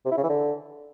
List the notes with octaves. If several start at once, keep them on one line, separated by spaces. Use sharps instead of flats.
C3
E4
C#3
E3
D3